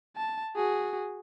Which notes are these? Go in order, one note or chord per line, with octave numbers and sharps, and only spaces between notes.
A5
F#4 G#4